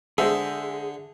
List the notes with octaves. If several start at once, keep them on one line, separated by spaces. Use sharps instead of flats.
D3 G#3 G#4 C5 E5